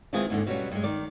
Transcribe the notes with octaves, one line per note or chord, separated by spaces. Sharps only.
D#3 E3 G#3 C4 F4 G#4
D#2 G#2 D3
B2 F#3 G3 C#4
G2 G#3
D#3 D5